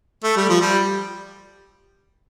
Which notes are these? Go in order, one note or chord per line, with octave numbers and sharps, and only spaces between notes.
A3
G3
F3
G3